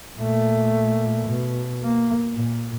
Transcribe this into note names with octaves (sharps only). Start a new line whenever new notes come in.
A#2 A3
B2
A#3
A#2